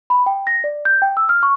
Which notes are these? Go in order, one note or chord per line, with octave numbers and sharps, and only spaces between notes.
B5
G5
A#6
D5
G6
G5
E6
F6
C#6